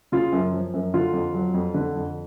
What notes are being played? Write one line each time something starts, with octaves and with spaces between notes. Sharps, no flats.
C#3 F4
F#2
F3
F#2
D3 F4
F2
F#3
F2
D3
F2